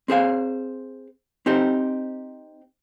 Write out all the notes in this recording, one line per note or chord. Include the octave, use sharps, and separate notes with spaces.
C4 G#4 C5 F5
C4 D#4 G4 C5